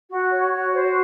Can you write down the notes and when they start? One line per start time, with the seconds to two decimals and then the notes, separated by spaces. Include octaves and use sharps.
0.10 F#4
0.31 C#5
0.53 F#4
0.74 C5